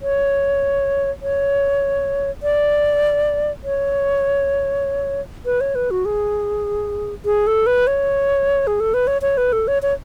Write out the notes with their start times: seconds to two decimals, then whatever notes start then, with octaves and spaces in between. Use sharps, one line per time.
0.02 C#5
1.22 C#5
2.43 D5
3.64 C#5
5.46 B4
5.61 C#5
5.75 B4
5.91 F#4
6.05 G#4
7.26 G#4
7.47 A4
7.67 B4
7.87 C#5
8.67 G#4
8.80 A4
8.94 B4
9.07 C#5
9.22 C#5
9.37 B4
9.53 A4
9.68 C#5
9.82 C#5